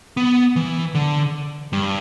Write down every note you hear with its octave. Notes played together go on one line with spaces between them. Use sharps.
B3
E3
D3
G2